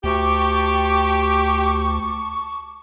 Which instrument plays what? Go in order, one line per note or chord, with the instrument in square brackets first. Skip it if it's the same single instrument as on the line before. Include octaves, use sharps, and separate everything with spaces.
[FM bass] D2 [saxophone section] G4 [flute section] A5 C#6 D6